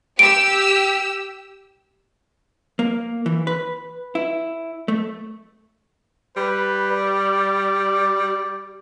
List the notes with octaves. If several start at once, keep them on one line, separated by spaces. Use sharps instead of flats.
G4 E6 D7
A#3
E3
B4
E4
A3
G3 B4
D5